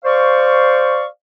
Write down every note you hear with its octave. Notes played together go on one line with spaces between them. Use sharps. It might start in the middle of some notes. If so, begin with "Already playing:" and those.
C5 D5 F5 C#6